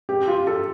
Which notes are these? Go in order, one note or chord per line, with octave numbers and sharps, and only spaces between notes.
G4
F4
A4